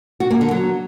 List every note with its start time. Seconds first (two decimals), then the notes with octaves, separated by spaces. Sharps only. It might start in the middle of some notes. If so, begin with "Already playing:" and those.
0.20 F#4
0.31 A#3
0.41 D3
0.51 F#3